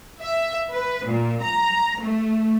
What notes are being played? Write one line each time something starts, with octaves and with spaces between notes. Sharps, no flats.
E5
B4
A#2
A#5
A3